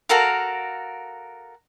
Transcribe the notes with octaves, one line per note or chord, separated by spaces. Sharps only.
F#4 A4 A#4 F5